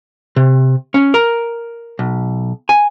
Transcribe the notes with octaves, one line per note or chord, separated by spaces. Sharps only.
C3
C#4
A#4
B1
G#5